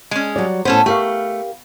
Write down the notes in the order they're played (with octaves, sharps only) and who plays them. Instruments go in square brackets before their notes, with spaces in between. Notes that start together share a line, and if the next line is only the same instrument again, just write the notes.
[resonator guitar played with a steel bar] G#3 C#4
[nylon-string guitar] F#3 G3 D5
[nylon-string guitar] A2 C5 [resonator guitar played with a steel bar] B3 C#4 A4
[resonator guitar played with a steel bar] A3 [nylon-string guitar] G4 A#4 F5